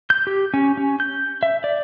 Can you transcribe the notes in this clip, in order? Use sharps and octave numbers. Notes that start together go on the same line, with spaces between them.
G6
G4
C#4
C#4
G6
E5
D5